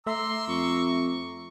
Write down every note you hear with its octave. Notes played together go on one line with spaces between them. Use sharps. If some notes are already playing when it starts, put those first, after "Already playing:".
A3 E5 A#5 C6 D6 E6
F2 C#6